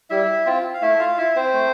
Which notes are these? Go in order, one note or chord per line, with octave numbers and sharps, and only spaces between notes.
G3 E4 E5
C4 F4
F5
A3 E4 E5
F4 F5
E4 E5
C4 C5
A3